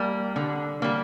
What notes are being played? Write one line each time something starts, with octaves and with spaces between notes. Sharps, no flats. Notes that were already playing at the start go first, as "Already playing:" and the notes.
Already playing: G3 A#3
D3
G3 A#3